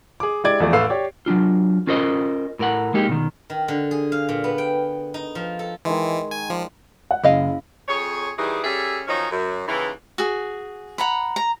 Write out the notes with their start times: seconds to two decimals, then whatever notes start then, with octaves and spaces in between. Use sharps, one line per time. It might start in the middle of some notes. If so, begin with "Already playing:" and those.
0.20 G#4 D6
0.44 G#3 E4 G4 D5 G#6 D7
0.60 E2 F3 A3 D5
0.73 A1 A3 B4 F5 E6 C7
0.89 G4 C#5 D5
1.26 F#3 C#4 D4 F4
1.87 C#4 F4 A#4 C5 D#5
2.59 A2 A#4 F#5
2.94 G#3 A#3 D#4 G4
3.09 B2 D#3
3.50 D#3
3.68 D3
3.91 G#4
4.12 F5
4.29 A#2
4.44 B3
4.58 G5
5.14 D#4
5.35 F3
5.59 A4
5.85 D#3 E3 G#3
6.31 G#5
6.50 F3 F4 D5 C6
7.11 F#5
7.24 F#1 E4 D#5 F5
7.88 F2 G#4 C#5
8.37 D#3 E3 G3 G#4
8.63 G3 C#4 G#4 A4 E5
9.07 D#3 F3 F#3 C#4 D#4
9.31 F#2
9.67 D#2 C#3 E3
10.18 F#4 G#4
10.98 F#5 A#5 B5
11.36 A#5